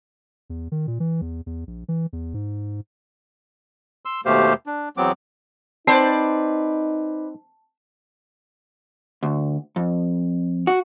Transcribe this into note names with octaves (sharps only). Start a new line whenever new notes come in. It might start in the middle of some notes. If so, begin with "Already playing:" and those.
E2
D#3
A#2
E3
E2
E2
A#1
E3
E2
G#2
C6 E6
D#2 B2 A3 G4 C5 F5
D4
E2 F#3 B3 C4 D6
C4 D#4 B4 C5 D5 A5 C7
D2
F2
F#4